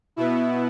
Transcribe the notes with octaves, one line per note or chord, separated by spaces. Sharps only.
B2 B3 E4